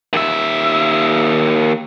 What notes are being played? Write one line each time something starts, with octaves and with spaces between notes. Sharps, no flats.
D#2 E5